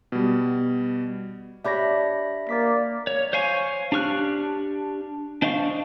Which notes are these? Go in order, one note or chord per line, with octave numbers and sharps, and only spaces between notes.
B2 G3
D4 G4 C#5 E5 B5 A#6
A#3 D5 D6 B6
C#5
C5 C#5 F5 G#5 C#6
D4 G4 C#6 F6 F#6
D4 C5 D#5 F5 C#6